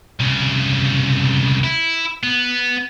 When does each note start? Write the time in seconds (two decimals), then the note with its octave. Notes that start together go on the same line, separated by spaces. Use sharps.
0.20 C2 C#3
1.64 E4
2.23 B3